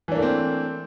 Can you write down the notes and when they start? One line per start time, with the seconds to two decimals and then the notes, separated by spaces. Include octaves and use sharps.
0.08 E3
0.12 D4
0.15 A#3
0.19 A3
0.22 C4